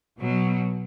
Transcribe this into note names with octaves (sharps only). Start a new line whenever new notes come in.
B2 F#3